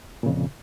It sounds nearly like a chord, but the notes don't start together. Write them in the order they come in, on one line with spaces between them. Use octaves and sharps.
A#2 C#3 F2